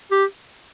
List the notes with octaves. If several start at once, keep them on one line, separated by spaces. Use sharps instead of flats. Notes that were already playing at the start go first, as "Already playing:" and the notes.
G4